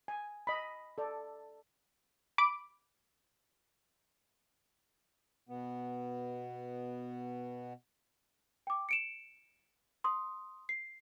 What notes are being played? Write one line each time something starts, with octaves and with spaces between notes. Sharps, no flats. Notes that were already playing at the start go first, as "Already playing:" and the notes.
G#5
D#5 B5
A4 D5
B5 D6 D7
B2 B3
G5 D6
C#7 D7 E7
C6 D#6
C7